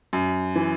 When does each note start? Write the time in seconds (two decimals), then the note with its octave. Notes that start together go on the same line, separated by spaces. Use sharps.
0.13 F#2
0.56 E3